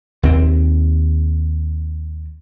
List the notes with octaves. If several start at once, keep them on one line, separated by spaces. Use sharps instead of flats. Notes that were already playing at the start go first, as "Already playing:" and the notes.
D#2 C4